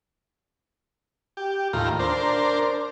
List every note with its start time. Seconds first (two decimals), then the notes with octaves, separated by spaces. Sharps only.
1.37 G4
1.73 D#2 A2 F4 A#5
2.00 D4 A#4 C5